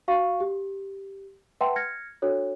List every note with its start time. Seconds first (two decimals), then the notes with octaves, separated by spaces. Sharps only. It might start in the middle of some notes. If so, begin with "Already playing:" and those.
0.08 F#4 F5 C#6
0.40 G4
1.61 B4 E5 F#5 G5 A5 C6
1.76 F6 G#6 A#6 C#7
2.22 D4 F#4 A4 C#5